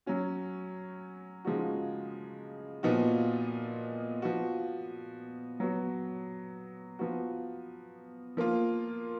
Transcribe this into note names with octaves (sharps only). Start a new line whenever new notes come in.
F#3 C#4 F#4
C#3 F3 G#3 D#4 F#4
A#2 F3 B3 D#4 F#4
F3 B3 F#4
F#3 B3 F#4
F3 B3 F#4
F3 A#3 F4